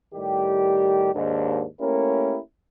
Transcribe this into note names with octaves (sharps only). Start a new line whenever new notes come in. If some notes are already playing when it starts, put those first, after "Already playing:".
A2 D#3 G3 G4
D#2 G#2 D4
A3 A#3 C#4 E4 G4 A#4